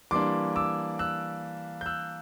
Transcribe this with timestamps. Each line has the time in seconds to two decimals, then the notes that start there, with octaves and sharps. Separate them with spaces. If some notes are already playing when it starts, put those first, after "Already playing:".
0.11 E3 G3 A#3 D4 C6 D6
0.56 D6 E6
0.99 E6 F#6
1.81 G6
1.86 E6 F#6